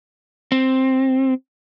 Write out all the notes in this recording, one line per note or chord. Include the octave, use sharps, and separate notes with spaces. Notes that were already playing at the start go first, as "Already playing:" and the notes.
C4